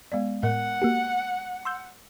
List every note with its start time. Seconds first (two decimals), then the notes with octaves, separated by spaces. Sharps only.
0.12 G#3 B3 D5
0.43 A2 A#4 F#5
0.82 A#3 F#4 G4
1.65 C6 E6 G6